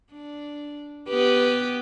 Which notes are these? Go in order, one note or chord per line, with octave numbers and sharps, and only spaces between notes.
D4
B3 G4 B4